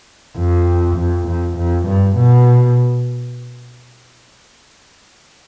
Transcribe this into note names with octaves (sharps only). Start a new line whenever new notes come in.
F2
F2
F2
F2
G2
B2